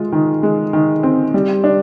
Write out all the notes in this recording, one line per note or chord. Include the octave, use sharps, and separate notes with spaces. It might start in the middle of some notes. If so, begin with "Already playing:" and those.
Already playing: G#3 F4
D#3
G#3
D#3
C4
G3
D4